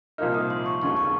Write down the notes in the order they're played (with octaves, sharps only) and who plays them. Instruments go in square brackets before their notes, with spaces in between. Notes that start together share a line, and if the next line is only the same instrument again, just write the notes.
[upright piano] C2 A#2 F3 A#3 D#4 [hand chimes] F6
[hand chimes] D#6
C6
C#6
[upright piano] F1 D#2 C#3 G#3 [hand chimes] C#6
[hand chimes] C#6